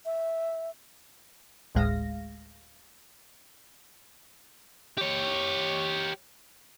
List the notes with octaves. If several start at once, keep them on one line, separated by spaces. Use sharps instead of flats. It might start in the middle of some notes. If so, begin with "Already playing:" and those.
E5
G1 D2 A2 G#3 F5 A#6
G4 C#5